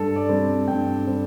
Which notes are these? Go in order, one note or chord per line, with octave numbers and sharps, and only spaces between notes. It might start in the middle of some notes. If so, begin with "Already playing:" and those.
Already playing: G2 A4
D5
G3 C4
G2 G5
G3 C4